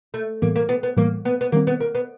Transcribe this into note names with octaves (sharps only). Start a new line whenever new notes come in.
A3
A2 E3 G3 A#3 B3
A#3
B3
B3
A2 E3 G3 A#3 B3
B3
B3
D#3 G3 A#3 C4
B3
A#3
B3